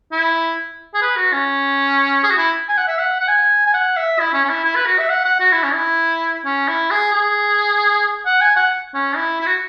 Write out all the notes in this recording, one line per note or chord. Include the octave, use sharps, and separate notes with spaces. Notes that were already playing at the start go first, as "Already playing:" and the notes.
E4
G#4
B4
F#4
C#4
G#4
F#4
E4
G#5
F#5
E5
F#5
F#5
G#5
G#5
F#5
E5
E4
C#4
C#4
E4
E4
B4
F#4
E5
F#5
F#5
F#4
E4
C#4
E4
C#4
E4
G#4
G#4
F#5
G#5
F#5
C#4
E4
E4
F#4